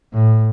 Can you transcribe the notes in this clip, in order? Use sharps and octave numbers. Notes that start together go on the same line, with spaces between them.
A2